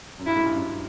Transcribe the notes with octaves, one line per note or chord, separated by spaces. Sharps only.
F#2
G2 E4
G#2
G2
F#2